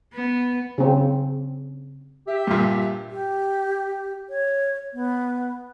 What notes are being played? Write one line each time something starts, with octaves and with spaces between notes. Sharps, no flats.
B3
C#3 C4
G4 E5
G2 A#2
G4
C#5
B3